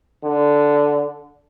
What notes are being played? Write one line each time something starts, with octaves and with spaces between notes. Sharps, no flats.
D3